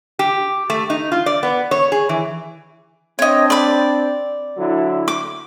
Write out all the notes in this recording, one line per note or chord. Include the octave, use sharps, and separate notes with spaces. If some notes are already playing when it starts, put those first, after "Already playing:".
G4
A3
D#4
F4
D5
B3
C#5
G#4
E3
C4 D4 C#5 D#5
D5 B5
D3 F#3 E4
D6